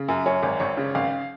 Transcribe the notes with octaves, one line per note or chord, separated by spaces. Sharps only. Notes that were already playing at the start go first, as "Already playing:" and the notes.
Already playing: C#3
F#2
F#2 C#5
G#1
G#1 C#5
C#3
G#1 F5